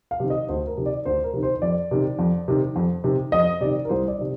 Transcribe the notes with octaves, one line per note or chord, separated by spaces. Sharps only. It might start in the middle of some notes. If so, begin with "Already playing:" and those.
F5
C3 D#3
D#5
D2 C5
A#4
C3 D#3
D5
D2 C5
A#4
C3 D#3
C5
C5
F2 D5
C3 D#3
F2
C3 D#3
F2
C3 D#3
F2 D#5
C3 D#3 D5
A#4
C2 C5
D5
C3 D#3